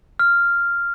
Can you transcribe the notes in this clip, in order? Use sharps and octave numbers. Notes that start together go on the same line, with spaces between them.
F6